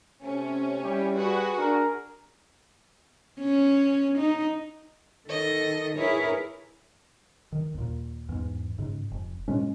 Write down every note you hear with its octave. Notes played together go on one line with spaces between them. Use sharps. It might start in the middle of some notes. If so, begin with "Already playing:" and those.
C3 A3 C#4
G3 E4 G4
F#4 G#4 B4
D4 A#4
C#4
D#4
D#3 A4 D#5 A#6
E4 G#4 A#4 B4 C#5
D#3
D#2 A#2
E2 G#2
G#2 C#3
F1
A#2 G#3 C#4